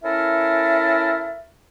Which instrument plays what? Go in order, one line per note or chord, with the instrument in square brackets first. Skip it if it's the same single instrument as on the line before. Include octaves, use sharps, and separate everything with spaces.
[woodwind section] C#4 E4 A4 A#4 E5